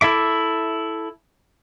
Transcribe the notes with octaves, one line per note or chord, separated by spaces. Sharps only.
E4 A4 E5 D6